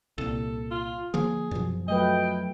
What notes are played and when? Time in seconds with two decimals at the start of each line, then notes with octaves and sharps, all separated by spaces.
0.18 C2 A#2 A4
0.71 F4
1.14 D3 F3 A#3 G#4
1.51 F#2 B2 F3
1.88 F#3 A3 B4 D#5 G5